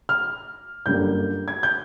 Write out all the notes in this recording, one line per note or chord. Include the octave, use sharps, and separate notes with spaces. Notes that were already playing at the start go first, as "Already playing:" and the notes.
F6
G1 F#2 D3 G3 A#3 G6
G#6
G6